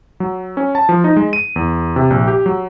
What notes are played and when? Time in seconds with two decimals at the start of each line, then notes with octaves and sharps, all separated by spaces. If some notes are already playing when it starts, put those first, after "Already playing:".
0.20 F#3
0.57 C#4
0.75 A5
0.89 F3
1.04 D#4
1.16 G#3
1.33 D#7
1.56 E2
1.96 C3
2.10 A#1
2.28 G4
2.46 F#3